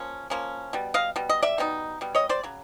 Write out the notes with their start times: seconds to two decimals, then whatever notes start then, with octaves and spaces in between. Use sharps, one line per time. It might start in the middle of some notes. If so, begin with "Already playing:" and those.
Already playing: F3 A#3 C#4
0.30 F3 A#3 C#4
0.73 B2 G3
0.94 D#5 F5
1.16 B2 G3
1.29 D#5
1.42 D5 E5
1.58 B2 G3 C4 D#4
2.01 B2 G3
2.15 C#5 D#5
2.29 C5 D5
2.44 C#3 F#3